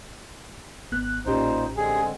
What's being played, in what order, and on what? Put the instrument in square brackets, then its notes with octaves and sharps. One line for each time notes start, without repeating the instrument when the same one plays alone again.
[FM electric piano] G#1 B3 F#6
[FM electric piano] A1 C#4 G4 [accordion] A#2 D#4 C5
[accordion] D3 G#3 C4 [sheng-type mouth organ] G#4